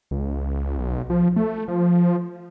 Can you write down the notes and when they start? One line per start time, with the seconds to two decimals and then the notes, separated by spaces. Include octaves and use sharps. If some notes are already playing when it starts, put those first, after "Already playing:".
0.11 C#2
0.78 B1
1.10 F3
1.36 A3
1.68 F3